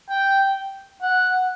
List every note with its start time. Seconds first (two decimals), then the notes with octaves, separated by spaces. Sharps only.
0.10 G5
1.02 F#5